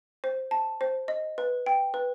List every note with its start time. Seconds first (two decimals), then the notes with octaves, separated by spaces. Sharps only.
0.24 C5
0.51 A5
0.81 C5
1.08 D#5
1.38 B4
1.66 G5
1.94 B4